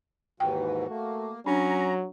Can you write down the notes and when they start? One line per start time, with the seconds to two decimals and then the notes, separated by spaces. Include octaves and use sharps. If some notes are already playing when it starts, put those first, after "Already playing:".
0.40 D#2 G#2 E3 F#4 G5
0.90 A3 A#3
1.46 F#3 C#4 D4 A#5